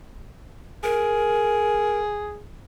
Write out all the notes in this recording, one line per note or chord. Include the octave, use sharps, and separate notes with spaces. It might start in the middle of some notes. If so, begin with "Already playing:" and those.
G#4 A#4